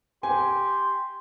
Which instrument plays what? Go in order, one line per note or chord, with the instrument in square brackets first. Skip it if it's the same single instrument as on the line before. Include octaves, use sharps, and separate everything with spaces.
[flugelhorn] G4 [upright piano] G#5 [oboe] C6